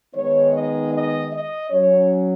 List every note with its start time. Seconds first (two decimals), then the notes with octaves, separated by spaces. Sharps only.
0.13 D#3 G#3 B3 D#4 C#5
0.53 D#5
0.92 D#5
1.31 D#5
1.70 F#3 C#4 C#5